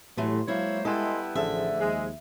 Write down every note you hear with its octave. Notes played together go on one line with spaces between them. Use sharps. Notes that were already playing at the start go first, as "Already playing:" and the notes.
A2 E3 F#3 A3 G4 C6
F#3 G#3 A#3 E4 C5 C#5 F5
G3 B3 E4 A4 D#5 G#5 C6
A1 D3 F3 A3 G#4 C5 E5
D#2 G#3